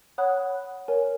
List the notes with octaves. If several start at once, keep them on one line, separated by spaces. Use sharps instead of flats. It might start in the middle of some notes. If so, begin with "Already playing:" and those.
C#5 F#5 B5 D#6 F#6
A#4 C#5 G#5